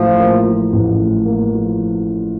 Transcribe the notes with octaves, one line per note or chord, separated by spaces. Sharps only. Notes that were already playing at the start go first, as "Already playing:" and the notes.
Already playing: A1 A2 F3
A#3
F3
A1
A2
A#3
F3